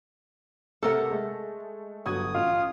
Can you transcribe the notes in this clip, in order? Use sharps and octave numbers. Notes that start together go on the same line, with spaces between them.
C3 A3 A4 A#4 F#5
G#3 A3
G1 F#3 F#4 D#6 G#6
A1 F4 F6